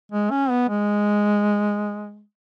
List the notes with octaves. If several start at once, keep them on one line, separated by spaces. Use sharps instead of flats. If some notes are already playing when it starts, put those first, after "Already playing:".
G#3
C#4
B3
G#3